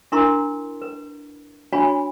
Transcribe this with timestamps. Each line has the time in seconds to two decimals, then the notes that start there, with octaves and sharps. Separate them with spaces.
0.12 D4 E4 A#4 A#5 C6
0.82 B4
1.73 D4 F#4 C#5 G#5 B5